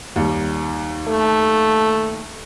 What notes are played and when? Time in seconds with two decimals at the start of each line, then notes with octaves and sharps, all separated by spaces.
0.16 D#2 G3
1.08 A3